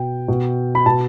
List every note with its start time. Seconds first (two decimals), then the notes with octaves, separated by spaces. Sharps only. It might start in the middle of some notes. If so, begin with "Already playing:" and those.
Already playing: B2 G5
0.28 B2
0.75 B5
0.86 B2 A5